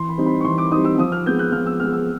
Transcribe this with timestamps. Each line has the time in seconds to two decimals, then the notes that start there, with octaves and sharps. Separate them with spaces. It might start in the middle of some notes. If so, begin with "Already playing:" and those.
Already playing: E3 C6
0.09 B5
0.18 G3 C4 D#4
0.26 B5
0.41 C#6
0.44 E3 C6
0.58 D6
0.71 G3 C4 D#4 D#6
0.85 E6
0.98 F3 D#6
1.12 F6
1.26 G#3 B3 G6
1.39 F#6
1.52 F3 F6
1.66 E6
1.80 G#3 B3 F6
1.93 E6